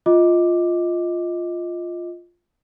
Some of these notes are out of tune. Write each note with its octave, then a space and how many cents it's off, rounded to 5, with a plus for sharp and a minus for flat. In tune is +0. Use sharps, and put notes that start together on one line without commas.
F4 +0 D#5 +15 D6 +0